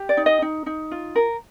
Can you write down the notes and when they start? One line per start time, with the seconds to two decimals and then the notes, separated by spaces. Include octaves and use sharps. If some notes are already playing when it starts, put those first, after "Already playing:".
Already playing: G4
0.09 D5
0.17 D#4
0.26 D#5
0.42 D#4
0.66 D#4
0.91 F4
1.16 A#4